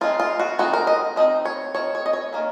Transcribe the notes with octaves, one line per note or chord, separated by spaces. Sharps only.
F3 G#3 C4 D#4 F4
F4
F#4
F3 G#3 C4 D#4 F#4
A#4
D#5
F3 C4 D#4 D#5
C#5
F3 C4 D#4 C#5
C#5
D#5
C#5
D#3 A#3 C#4